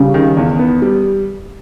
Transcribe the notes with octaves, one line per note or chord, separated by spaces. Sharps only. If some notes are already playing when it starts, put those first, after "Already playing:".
Already playing: C#3 G3
D#3
E2
B3
G3